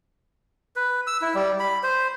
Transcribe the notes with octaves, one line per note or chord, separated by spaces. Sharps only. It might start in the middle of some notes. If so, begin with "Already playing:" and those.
B4
E6
E4
G3
B5
C5